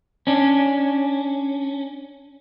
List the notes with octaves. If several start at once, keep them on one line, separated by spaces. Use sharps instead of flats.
C#4 D4